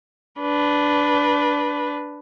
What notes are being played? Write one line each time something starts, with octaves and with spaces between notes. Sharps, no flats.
D4 B4